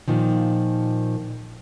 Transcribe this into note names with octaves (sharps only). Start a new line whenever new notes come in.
A#2 D#3 F3